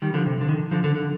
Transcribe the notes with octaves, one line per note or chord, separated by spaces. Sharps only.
D#3 G3
D3 F3
C3
D3
D#3
D3 F3
D3
D3